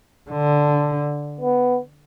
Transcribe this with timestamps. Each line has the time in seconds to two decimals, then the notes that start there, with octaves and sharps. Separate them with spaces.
0.31 D3
1.40 B3